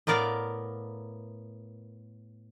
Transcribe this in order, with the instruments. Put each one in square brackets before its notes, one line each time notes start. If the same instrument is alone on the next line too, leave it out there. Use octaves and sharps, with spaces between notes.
[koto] A2 B3 A#4 D5 F5 A#5